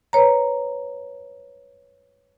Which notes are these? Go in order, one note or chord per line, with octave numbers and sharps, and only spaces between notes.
B4 C#5 A#5